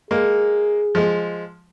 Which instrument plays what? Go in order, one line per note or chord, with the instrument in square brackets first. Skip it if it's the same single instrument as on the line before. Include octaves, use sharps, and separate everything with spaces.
[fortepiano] G#3 A#3 [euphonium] G#4
[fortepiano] F3 G#3